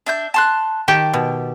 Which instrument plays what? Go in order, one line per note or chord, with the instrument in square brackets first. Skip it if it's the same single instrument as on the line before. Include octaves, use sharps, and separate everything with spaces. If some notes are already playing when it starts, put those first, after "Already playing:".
[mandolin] D4 E5 G6
A5 C6 F#6
[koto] D#3 G4 G5 [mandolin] A5
[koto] B2